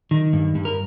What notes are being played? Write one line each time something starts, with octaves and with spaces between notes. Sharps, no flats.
D#3
G2
G2
A#4